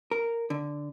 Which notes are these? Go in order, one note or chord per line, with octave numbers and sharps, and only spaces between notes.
A#4
D3